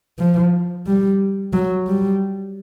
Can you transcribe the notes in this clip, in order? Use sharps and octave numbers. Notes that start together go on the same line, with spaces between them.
F3
G3
F#3
G3